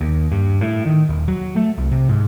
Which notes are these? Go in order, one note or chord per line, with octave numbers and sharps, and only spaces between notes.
D#2
G2
A2
D#3
D#1
F#3
A3
C2
C3
G#2